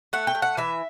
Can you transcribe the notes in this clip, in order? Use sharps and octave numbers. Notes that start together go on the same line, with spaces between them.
A3 F#5
G5
A3
F#5
E3 E5